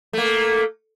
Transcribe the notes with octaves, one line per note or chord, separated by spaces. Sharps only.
A3 A#3